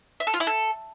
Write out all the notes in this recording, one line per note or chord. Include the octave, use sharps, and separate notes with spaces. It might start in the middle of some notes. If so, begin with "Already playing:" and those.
E5
A4
F4
E4
A4